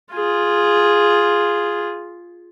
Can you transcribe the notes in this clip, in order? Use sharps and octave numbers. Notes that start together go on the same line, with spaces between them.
F4 G#4